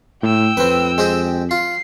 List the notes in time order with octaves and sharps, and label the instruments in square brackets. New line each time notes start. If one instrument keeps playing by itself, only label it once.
[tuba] A2 [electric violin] G5 E6
[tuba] F2 [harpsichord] C4 B4
[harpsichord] G#3 C4 G4
[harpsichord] F4 [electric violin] C7